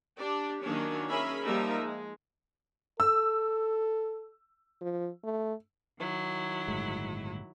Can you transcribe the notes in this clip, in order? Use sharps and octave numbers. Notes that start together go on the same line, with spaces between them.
D4 G4 D5
D#3 F#3 A#3 C#4 D4 C#5
C#4 G#4 A#4 E5 B5
F3 G3 A#3 D#4 A#4 E5
G#3
A4 E6
F3
A3
D#3 F#3 E4
G1 A2 G#3